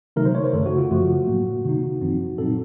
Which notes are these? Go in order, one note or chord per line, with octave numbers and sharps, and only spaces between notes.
C3 D#3 F#3 A3 D#4 A#4
C5
C#5
C5
F#2 C#3 A3 A4
F#4
F4
F#2 C#3 F3 A3 F#4
A2 F#3 A#3
C3 D#3 A#3 D#4
F#2 F3 C4 D#4
A#2 F#3 C4 D#4 A4